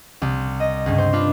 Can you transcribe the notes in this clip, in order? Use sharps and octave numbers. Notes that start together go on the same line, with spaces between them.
C2
D#5
C#2 G2
C5
D4 F4 B4 B5